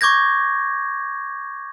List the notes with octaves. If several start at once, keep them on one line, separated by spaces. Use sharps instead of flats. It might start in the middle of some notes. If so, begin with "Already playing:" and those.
C#6 D6 G6 G#6 A#6